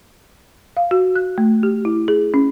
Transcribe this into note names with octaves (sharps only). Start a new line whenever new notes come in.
F5
F#4
F#6
A3
G4
E4
G#4
C#4